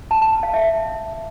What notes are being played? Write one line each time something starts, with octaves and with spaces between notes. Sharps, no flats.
A5
A5
F5
E5